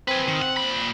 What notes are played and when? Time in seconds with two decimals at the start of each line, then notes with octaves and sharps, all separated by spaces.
0.08 C4 G#4 B4
0.28 D#3
0.42 F#5
0.57 A#2 B5